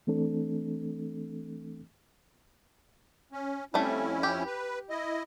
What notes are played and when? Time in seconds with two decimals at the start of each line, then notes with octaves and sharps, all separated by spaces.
0.07 E3 A3 C4 D4 A4
3.32 C#4
3.74 F2 G3 A3 C#4 E4
4.23 G4
4.46 B4
4.90 E4 D#5